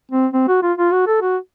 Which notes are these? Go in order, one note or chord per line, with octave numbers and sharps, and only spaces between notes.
C4
C4
F#4
F4
F4
F#4
A4
F#4